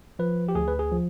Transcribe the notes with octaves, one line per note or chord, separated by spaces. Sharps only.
F3 B4
G4
D2 G#4
B4
G#4
F3